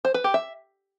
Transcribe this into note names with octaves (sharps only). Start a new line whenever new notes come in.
C5
B4
G4
E5